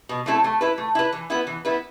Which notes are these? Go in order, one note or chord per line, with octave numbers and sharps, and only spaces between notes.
B2
A3 C4 E4 A4
A3
E4 B4
A3
E4 B4
E3
B3 E4 B4
E3
B3 E4 B4